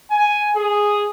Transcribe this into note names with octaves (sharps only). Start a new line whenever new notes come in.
G#5
G#4